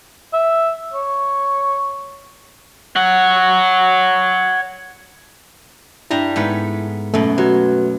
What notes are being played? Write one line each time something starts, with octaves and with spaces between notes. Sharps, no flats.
E5
C#5
C#5 F#5
G2 G3 E4 A#5
G#2 A3 B3
F#2 B2 A3
F#3 F#4 B4